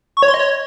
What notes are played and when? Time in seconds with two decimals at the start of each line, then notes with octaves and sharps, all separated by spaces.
0.17 C#6
0.23 C#5
0.28 C6
0.34 D#5
0.40 C#5